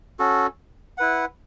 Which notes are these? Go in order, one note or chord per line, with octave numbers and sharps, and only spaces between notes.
C#4 F#4 A4
E4 B4 F#5